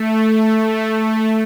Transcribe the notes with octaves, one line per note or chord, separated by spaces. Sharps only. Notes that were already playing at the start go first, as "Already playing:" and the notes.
Already playing: A3